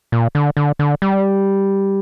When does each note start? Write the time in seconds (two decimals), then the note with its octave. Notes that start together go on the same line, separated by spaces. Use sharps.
0.12 A#2
0.35 D3
0.57 D3
0.79 D3
1.02 G3